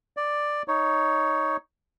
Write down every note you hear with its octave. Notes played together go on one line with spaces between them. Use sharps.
D5
D#4 C#5